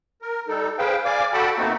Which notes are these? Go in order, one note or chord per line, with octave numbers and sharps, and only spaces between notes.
A#4
G3 D#4 A4
G#4 B4 C5 F5 G5
D5 F5 G#5 D6
F#4 A4 F#5 G5 A5 B5
B2 A3 A#3 C4 D#4 F#4